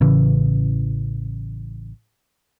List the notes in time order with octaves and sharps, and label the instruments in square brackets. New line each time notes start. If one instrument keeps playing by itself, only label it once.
[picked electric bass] A1 C#3 E3